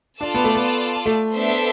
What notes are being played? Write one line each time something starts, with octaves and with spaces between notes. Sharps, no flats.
D4 F4 A4 D5 A5
B3
A3
B3
A3
B3 D4 A4 C5 E5